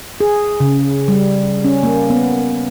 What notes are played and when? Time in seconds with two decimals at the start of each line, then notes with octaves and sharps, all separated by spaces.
0.20 G#4
0.60 C#3
1.08 G3
1.65 C#4
1.83 A#3
2.10 B3